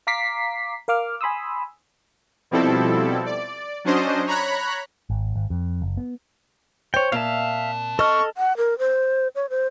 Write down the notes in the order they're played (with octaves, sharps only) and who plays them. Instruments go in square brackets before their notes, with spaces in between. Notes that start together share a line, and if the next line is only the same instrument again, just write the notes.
[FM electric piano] F5 A#5 D6 B6 C7
A#4 F5 D6 F6
G#5 B5 C6 D#6 E6
[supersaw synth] B2 F3 G3 C4 E4 A4
D5
F#3 C#4 D4 C5 D#5
C#5 A#5 B5 F#6
[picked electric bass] G#1
G#1
F2
F#1
B3
[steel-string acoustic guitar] C5 [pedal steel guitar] C#5 G5
[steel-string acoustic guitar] A#2 [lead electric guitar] C4 A5 [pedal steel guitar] E5 F5
[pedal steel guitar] A4 F6 [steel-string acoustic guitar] D#5 [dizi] C#6
[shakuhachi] F#5
A#4
C5
C#5
C5